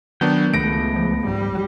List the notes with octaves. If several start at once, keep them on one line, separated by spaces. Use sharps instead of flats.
D#3 F#3 B3 D4 G5
C#2 A3 B3 A#6 D7
F3
G#2 G3